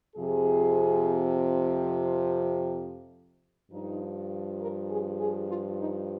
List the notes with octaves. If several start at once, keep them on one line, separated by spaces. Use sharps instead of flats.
F2 C3 F3 G#4
G2 F3 D#4
A#4
G#4
G#4
F4
D#4